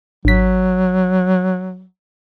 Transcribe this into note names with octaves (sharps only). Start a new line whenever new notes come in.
G#1 F#3 B6